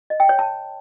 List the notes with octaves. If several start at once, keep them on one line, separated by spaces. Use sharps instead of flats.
D#5
G5
C#5
A5